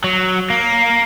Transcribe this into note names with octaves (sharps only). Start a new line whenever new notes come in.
F#3
A#3